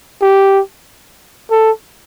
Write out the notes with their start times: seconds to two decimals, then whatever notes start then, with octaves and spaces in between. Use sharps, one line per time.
0.22 G4
1.51 A4